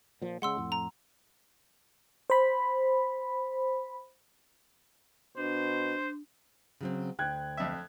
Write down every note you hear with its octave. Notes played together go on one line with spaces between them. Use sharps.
A#2 F3
C#3 G#3 F#5 C6 E6
F2 A2
A#5
C5 B5
B2 D4 C5
C#3 F#3 C4
D2 G5 F#6 G#6
F2 E5